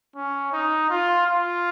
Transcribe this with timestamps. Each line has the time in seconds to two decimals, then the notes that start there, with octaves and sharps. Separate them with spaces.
0.16 C#4
0.52 D#4
0.90 F4
1.27 F4